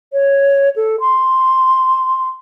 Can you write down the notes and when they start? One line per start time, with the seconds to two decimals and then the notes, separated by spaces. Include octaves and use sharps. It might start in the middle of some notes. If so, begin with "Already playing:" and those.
0.13 C#5
0.76 A4
1.00 C6